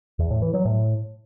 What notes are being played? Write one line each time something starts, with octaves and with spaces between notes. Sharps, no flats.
E2
A2
E3
F#3
A2